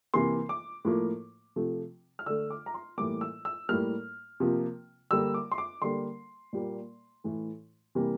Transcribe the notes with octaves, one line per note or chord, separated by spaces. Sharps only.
C3 E3 A#3 C6
D6
A2 F3 A#3
C3 F3 A3
F6
D3 A3 E6
D6
A#5
C6
A2 E3 G3 A#3 D6
E6
E6
A2 G3 A#3 F6
C3 F3 A#3
D3 G3 A#3 E6
D6
C6
D6
D3 G3 A#3 C6
A#2 G3 A#3
A2 E3 A3
C3 E3 G3 A#3